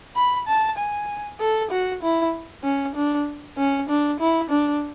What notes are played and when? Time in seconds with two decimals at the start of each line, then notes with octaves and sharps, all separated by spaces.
0.16 B5
0.48 A5
0.78 G#5
1.40 A4
1.71 F#4
2.02 E4
2.64 C#4
2.95 D4
3.58 C#4
3.89 D4
4.20 E4
4.50 D4